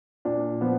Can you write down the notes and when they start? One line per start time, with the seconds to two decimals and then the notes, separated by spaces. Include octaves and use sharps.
0.25 A#2 D4
0.61 F3 B3